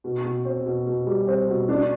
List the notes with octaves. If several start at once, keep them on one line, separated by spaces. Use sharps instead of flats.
B2
B2
C4
B2
B2
G3
C4
B2
D4